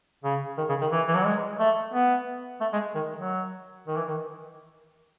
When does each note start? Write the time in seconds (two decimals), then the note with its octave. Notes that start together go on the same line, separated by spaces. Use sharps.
0.24 C#3
0.58 D#3
0.69 C#3
0.81 D#3
0.92 E3
1.08 E3
1.16 F#3
1.25 G#3
1.60 A3
1.94 B3
2.61 A3
2.73 G#3
2.95 D#3
3.17 F#3
3.88 D#3
3.97 E3
4.08 D#3